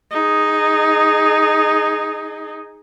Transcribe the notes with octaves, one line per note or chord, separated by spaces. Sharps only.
D#4 G#4